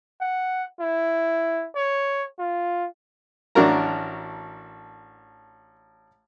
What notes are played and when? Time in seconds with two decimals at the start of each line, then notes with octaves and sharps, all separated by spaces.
0.21 F#5
0.80 E4
1.76 C#5
2.39 F4
3.55 A1 D4 F#4 A#4 A#5